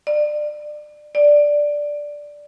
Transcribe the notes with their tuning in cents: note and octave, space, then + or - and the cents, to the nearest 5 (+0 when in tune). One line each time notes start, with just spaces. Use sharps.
D5 +25
D5 +0